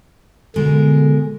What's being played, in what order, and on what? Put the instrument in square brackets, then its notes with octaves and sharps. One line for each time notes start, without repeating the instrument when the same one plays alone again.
[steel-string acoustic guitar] B2 G#3 A#4 [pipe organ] D3